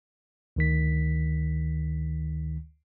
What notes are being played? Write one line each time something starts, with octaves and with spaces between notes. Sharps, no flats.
D2 D#3 B6